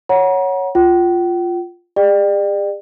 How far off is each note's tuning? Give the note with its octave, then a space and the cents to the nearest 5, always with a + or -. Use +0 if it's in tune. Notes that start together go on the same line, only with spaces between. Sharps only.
C#5 +0 F#5 +0 A#5 +35
F4 +0 G5 -40
G#4 -45 D5 +35 G5 +0